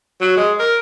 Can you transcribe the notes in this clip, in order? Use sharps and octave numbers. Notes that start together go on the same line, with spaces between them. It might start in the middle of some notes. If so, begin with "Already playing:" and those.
F#3
G#3
A#4